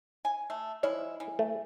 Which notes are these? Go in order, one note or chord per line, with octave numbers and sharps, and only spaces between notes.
G#5
A3
F3 G#3 E4 C#5
E3
A3